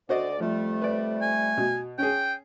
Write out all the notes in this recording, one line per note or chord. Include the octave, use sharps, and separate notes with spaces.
D2 F#4 C5 D5 D#5
F2 F3 G3 A3
B4 D5
G#5
B2
C#4 G#4 G5